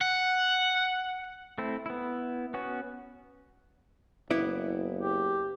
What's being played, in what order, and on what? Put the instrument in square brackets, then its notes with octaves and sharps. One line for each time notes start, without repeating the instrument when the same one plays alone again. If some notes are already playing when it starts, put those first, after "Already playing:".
[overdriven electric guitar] F#5
[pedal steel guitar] A3 C4 E4
B3 E4
B3 C#4 F#4
[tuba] F#1 [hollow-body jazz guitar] B3 E4 D5
[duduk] G4